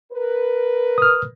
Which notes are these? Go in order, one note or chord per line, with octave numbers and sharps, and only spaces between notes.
A#4 B4
D#6 F6